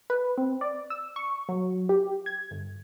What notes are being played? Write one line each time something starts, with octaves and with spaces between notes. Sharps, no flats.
B4
C4
D5
E6
C#6
F#3
G4
G#6
G1